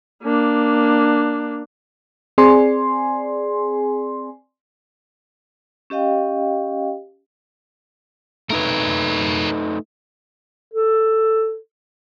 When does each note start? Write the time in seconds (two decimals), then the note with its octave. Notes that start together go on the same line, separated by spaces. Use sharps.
0.23 A#3 D4
2.38 C4 G#4 D5 G#5 C6
5.90 C#4 G4 D#5 F5 G5
8.50 A3 D#4 A#4 B4 C#5
10.74 A4